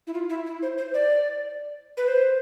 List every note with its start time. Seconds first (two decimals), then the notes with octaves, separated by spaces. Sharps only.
0.07 E4
0.14 F4
0.30 E4
0.46 E4
0.62 C5
0.78 C5
0.94 D5
1.97 B4
2.08 C5